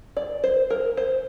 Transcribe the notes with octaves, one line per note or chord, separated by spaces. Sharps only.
D5
C5
A#4
C5